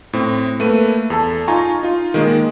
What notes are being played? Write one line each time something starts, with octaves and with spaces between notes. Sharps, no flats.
A2 C4
A3 A#3 B4 D#7
E2 A4 A5
D#4 F4 G#5 A#5 C#6
D#4 F4
D#3 G#3 A#3